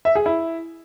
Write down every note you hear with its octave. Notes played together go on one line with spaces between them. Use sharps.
E5
G#4
E4